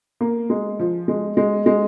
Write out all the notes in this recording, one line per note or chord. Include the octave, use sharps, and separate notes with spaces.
A#3
G#3
F3
G#3
G#3
G#3